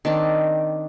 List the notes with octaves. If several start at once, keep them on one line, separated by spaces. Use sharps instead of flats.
D#3 C4 D4